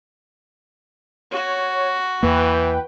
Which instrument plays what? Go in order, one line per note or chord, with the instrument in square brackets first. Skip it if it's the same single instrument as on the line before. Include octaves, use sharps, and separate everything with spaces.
[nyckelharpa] F#4 [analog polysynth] C#5
[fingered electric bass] E2 A#3 [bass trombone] E3 [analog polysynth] B4 G5